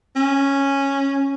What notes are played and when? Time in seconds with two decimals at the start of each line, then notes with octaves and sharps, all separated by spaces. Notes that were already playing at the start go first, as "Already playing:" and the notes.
0.16 C#4